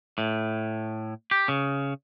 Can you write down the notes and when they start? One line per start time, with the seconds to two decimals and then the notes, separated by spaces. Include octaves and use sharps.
0.18 A2
1.31 G4
1.48 C#3